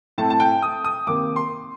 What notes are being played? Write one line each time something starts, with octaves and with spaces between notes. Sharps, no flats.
A2 A3 C4 A5
A5
G5
D#6
D#6
C3 D#3 A#3 D6
C6